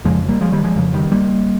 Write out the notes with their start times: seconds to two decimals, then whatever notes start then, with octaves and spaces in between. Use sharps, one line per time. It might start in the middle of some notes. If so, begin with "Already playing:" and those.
0.05 F2 C#3 F3 G#3
0.28 G3 A#3
0.41 F3 G#3
0.52 D#3 G3
0.64 F3 G#3
0.76 F2 C#3 F3
0.94 D#3 G3
1.12 G3 A#3